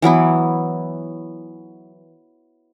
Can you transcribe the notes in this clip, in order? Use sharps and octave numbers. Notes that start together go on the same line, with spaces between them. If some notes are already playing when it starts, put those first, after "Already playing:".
E3 F#3 B3 E4